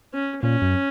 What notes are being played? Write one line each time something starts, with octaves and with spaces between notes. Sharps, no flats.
C#4
A#2 C#4
F#2